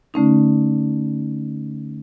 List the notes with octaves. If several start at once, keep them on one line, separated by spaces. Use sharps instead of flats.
D3 A3 C#4 D#4